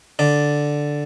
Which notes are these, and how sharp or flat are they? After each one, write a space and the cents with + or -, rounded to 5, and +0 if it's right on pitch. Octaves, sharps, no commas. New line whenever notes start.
D3 +0 D5 +0